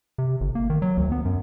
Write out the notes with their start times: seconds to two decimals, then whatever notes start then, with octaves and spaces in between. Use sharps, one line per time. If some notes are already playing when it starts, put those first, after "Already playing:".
0.18 C3
0.41 G1
0.55 A#3
0.70 D#3
0.82 F#3
0.97 D2
1.12 B3
1.25 F#2